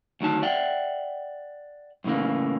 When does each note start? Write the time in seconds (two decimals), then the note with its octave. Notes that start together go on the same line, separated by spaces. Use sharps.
0.21 D2 D#3 F#3 A5
0.42 D5 E5 F#5 G5
2.04 F#2 A2 C#3 E3 A#3